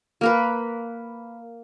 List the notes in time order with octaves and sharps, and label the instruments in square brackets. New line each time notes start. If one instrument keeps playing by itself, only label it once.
[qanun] A#3 A#4 B4